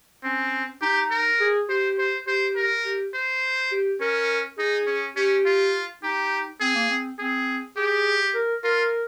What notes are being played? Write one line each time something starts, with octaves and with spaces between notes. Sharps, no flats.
C4 C#4
D#4 G4
A#4
G#4
G4 C5
C5
G4 C5
A#4
G4
C5
G4
C#4 A#4
D#4 G#4
C#4
C#4 G4
F4
D#4 G4
C4 G#4
A#3
C4
C4 G#4
G4 G#4
A#4
F4 A#4